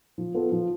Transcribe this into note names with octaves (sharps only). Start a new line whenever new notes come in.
F3
B3 F4 A4
F3